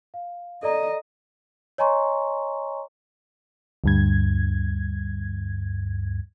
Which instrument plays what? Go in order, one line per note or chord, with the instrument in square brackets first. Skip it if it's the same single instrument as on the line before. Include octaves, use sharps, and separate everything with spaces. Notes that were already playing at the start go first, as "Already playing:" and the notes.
[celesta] F5
[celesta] A4 D5 A#5 [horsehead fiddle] D#5
[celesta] C#5 D#5 G#5 A#5 C6 C#6
[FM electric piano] D2 G2 G#6